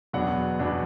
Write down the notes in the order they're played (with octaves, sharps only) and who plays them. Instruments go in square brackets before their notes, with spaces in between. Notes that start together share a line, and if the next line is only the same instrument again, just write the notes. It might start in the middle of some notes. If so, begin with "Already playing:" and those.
[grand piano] E2 B2 F#3 B3 D4 F#5
E2 B2 F#3 B3 D4